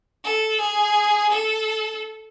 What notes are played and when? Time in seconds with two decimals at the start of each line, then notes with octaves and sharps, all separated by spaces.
0.25 A4
0.61 G#4
1.32 A4